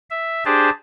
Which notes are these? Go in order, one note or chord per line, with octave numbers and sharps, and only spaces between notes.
E5
D4 G4 G#4 C5 A5